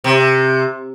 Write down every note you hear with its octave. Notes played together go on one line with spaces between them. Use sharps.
C3